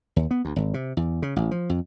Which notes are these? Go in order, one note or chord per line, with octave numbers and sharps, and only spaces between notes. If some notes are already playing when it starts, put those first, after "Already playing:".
D#2
B3
D2
G#1
C3
E2
C#3
A1
F3
F2